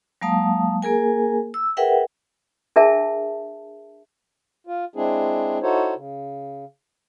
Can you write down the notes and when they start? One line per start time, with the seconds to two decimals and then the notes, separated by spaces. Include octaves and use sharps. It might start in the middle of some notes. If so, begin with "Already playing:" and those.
0.21 F#3 G#3 A#3 F5 A5 D#6
0.82 A#3 G#4 A#4 G#5
1.54 E6
1.77 G#4 A#4 B4 E5 F#5 G5
2.76 D4 G#4 A#4 E5 A5
4.67 F4
4.96 G#3 C4 D4 E4 G#4
5.62 D#4 E4 F#4 A4 C5 C#5
5.96 C#3